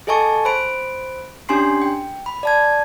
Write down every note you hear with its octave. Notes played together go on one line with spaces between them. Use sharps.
G#4 A4 D#5 G#5 A5 C#6
C5 B5 D7
C#4 D4 G4 G#5 C6 C7
G5
B5
D5 A5 G#6